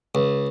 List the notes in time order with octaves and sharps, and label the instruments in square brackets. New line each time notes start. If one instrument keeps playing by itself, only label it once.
[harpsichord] C#2